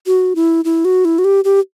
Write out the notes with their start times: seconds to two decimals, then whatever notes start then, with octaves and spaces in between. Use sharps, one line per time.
0.07 F#4
0.36 E4
0.65 E4
0.85 F#4
1.05 E4
1.19 F#4
1.24 G4
1.44 G4